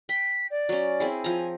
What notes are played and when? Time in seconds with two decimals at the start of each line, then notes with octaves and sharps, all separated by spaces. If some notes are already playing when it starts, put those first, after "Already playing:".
0.09 G5 B6
0.51 D5
0.69 F#3 C#4
1.00 C4 E4 G#4
1.24 F3 G#5 A#5